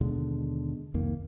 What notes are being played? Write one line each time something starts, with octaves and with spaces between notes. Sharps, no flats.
D#2 B2 D3 G#3
C2 F2 D#3 A#3